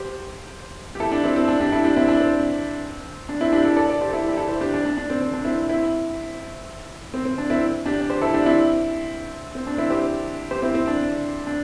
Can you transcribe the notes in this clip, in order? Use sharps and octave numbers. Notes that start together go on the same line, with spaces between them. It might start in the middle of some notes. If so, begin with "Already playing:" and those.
Already playing: G4 C5
G4
E4 A4
D4 G4
C4 E4
C4
D4
D4 G4
E4 A4
D4 G4
C4 E4
D4
C4
D4
C4 E4
D4 G4
E4 A4
A4 D5
A4 D5
G4 C5
E4 A4
G4
E4 A4
G4 C5
D4 G4
D4
D4
D4
C4
C4
D4
C4 E4
C4 E4
C4
C4
D4
C4 E4
D4 G4
D5
G4 C5
E4 A4
D4 G4
C4 E4
C4
D4
C4 E4
G4 C5
G4 C5
C4 E4
C4
D4
D4